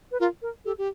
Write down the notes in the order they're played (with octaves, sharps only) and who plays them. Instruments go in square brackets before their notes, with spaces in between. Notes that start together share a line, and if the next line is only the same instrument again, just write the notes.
[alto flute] B4
[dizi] F4 [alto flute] A#4
[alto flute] A#4
[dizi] G4 [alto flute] A4
[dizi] G4